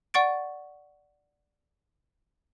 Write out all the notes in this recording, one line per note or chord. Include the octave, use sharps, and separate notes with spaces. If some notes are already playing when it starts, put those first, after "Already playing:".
D5 F#5 C#6 A6 D7